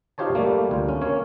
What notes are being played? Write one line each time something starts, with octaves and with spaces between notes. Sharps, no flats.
D#4 F4 G4 C5 C#5 A5
G3 A3 A#3
D2 F4
C#4
A#3 C#4 C#5